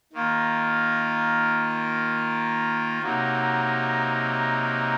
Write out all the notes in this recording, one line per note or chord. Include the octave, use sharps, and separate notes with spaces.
D#3 A#3 F4
C3 F#3 A#3 D#4